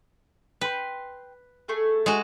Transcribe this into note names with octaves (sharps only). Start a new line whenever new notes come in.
B4 G5 C6
A3 G#4 A4
G#3 F#4